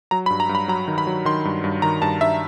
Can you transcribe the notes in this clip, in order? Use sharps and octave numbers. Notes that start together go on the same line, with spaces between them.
F#3 A#5
B5
G2
A#5
G2
B5
F#3 A#5
D#3
B5
F#3
D#3 C6
G2
G2
D#3 A#5
G2 A5
G2 E5